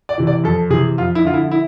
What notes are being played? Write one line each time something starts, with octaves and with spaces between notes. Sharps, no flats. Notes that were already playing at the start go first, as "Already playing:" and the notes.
D5
C3 E3
D5
F2 A4
C3 E3 G#4
F2 F4
E4
D3 F3 F4
E4
E4